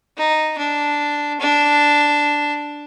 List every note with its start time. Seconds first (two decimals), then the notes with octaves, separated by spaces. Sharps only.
0.18 D#4
0.58 D4
1.40 D4